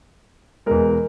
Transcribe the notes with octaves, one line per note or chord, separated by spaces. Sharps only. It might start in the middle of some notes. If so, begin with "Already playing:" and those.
E2 B2 G#3 A#4